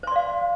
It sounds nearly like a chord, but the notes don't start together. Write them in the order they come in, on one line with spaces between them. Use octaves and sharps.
C5 C6 D5 F5